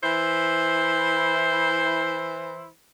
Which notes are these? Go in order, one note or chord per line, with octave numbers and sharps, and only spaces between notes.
E3 E4 C5